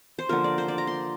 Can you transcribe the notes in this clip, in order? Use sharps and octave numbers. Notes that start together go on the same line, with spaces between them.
C5
D3 F3 A#3 A#4
D5
C5
D5
A#5
C6